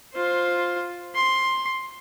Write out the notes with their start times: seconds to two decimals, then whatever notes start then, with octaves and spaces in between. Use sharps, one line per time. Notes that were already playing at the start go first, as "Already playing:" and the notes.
0.13 F4 C5
1.15 C6